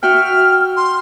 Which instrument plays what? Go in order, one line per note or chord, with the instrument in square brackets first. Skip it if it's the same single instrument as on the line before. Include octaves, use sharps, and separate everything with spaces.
[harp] F#4 E5 G5 [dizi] F6
[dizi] C6